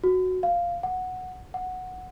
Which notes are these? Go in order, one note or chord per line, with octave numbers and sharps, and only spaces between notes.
F#4
F5
F#5
F#5